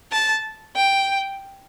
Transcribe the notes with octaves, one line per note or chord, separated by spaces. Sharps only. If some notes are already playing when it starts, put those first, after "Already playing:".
A5
G5